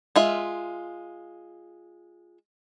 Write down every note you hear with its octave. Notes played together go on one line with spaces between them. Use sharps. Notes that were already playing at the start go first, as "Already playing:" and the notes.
G#3 F4 E5